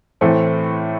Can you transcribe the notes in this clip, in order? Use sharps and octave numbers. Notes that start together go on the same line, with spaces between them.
A2 E3 A3 C4